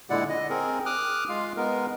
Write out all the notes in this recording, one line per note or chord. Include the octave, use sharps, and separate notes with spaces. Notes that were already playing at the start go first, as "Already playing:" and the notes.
A#2 D3 G#3 E4 D5 F#5
D#5
C4 G#4 A#4
D6 D#6 F6 F#6
G#3 F4 F5
G#3 B3 A#4